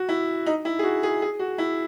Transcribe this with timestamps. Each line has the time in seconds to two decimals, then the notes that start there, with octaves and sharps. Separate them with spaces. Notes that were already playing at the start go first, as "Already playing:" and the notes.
Already playing: F#4
0.09 E4
0.46 D#4
0.65 E4
0.79 G#4
0.83 F#4
1.03 G#4
1.22 G#4
1.39 F#4
1.58 E4